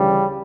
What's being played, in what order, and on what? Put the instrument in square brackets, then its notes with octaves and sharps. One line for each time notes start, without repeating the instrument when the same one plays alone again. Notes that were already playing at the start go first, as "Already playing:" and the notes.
Already playing: [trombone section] D2 C#3 E3 G3